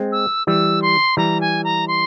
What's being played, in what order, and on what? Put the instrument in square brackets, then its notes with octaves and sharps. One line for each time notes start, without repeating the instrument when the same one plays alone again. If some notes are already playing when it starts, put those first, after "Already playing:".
Already playing: [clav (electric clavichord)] G#3 C4
[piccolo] E6
[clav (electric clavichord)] E3 G3 [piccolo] E6
[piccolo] C6
[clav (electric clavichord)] E3 G3 [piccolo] A#5
[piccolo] G#5
A#5
C6